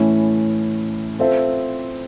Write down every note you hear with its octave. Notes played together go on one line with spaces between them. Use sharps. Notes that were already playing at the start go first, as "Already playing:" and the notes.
Already playing: A2 E3 A3 C#4 E4
C4 F4 A4 C5 E5